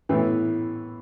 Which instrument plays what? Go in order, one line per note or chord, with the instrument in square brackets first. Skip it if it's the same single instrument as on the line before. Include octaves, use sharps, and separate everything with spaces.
[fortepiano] A2 E3 B3